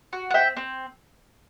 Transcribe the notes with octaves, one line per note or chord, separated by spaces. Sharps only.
F#4
F#5
C4 E5 G5
C4